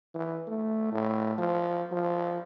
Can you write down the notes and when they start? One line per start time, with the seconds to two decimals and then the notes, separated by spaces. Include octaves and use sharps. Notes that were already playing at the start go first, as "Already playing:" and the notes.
0.15 E3
0.48 A3
0.92 A2
1.38 F3
1.92 F3